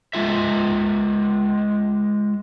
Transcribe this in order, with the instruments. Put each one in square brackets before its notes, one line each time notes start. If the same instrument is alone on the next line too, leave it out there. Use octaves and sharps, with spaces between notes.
[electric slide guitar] G#3 F4 E5